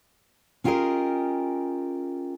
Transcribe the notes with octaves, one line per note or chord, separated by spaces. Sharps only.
C#4 F4 G4 G#4 A#4 D#5